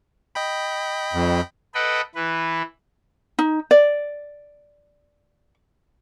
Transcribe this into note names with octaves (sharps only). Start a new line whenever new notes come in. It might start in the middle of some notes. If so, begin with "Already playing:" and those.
D#5 G5 B5
F2
A4 B4 D#5 F#5 G5 B5
E3 B4
D#4
D5